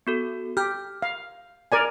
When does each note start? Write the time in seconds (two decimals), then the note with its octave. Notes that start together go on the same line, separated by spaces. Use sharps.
0.07 B3 F#4 A4
0.57 G4 F6 G6
1.02 F5
1.72 A#4 D5 G#5